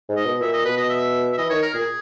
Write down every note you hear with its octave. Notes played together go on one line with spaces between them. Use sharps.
G#2
D#5
B2
A#2 E5
D#5
B2 B4
D#5
E5
E5
E3 D#5
D#3 C#5
A#4
A#2 G#4